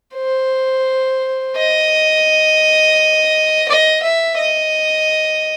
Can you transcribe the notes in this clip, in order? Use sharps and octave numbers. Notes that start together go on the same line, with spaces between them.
C5
D#5
D#5
E5
D#5